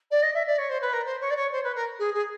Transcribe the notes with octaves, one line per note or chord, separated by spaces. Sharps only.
D5
D#5
E5
D5
C#5
C5
B4
A#4
C5
C#5
D5
C#5
C5
B4
A#4
G#4
G#4